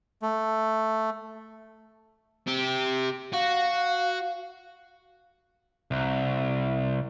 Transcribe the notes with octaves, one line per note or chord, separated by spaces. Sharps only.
A3
C4 G4
F#4 F5
C2